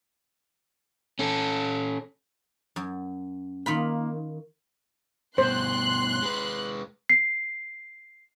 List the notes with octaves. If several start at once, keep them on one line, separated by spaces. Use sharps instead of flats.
C#4 A4
F#2
D#3 A#3 F4 B5
G2 B2 C5 C6 F#6
G#3 B4
C7